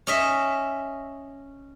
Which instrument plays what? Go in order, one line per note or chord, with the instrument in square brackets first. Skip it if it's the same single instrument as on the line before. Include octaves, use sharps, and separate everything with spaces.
[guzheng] C#4 D#5 E5